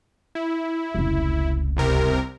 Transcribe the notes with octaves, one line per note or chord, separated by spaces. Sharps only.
E4
F1 C#2
C2 C3 A#4